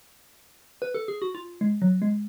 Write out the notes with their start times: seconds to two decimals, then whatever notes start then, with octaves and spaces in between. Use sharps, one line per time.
0.82 B4
0.94 A4
1.08 G#4
1.22 F#4
1.35 F4
1.61 G#3
1.82 F#3
2.02 G#3